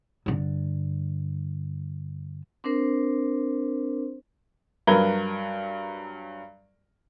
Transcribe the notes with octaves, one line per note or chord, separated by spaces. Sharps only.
G2 D3
C4 D4 A#4 C5
G2 F#3 A#4 B4 G#6 G7